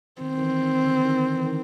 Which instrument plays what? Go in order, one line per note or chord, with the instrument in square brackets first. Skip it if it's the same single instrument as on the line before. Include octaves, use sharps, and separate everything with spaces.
[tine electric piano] D#3 [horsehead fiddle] C4
[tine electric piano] D#3
E3
D#3
D3
D#3
E3
D#3